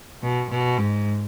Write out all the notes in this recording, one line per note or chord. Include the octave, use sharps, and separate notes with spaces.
B2
B2
G#2